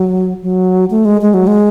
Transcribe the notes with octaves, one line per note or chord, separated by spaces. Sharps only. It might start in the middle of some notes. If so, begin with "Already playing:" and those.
Already playing: F#3
F#3
A3
G#3
G#3
F#3
G#3